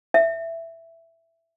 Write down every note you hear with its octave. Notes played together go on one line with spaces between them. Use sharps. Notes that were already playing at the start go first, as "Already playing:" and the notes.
E5